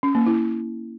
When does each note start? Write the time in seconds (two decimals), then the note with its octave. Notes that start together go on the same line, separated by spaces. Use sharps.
0.03 C#4
0.15 A#3
0.27 E4